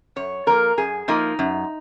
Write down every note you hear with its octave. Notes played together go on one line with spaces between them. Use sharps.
F#2 C#5
F3 A#3 A#4
F#2 G#4
F3 A#3 D#4
F#2